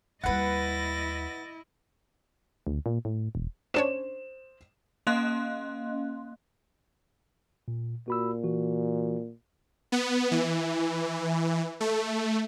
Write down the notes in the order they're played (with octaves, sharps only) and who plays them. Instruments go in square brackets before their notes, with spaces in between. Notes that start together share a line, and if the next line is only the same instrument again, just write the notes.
[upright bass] D#2 G3 [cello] E4 D#5 [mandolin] B4 F#5 [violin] A6 A#6
[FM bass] D2
A#2
A2
E1
[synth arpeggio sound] C#4 D4 C#5 [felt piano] C5 E7
[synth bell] A#3 C#4 D#5 F5 C6 F#6
[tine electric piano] A#2
[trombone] A#2 [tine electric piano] F#4 B5 E6
[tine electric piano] E3 F#4
[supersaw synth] B3
E3
A3